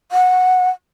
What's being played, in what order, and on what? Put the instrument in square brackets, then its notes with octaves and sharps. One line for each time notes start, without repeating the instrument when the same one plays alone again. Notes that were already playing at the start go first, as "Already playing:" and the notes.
[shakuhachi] F#5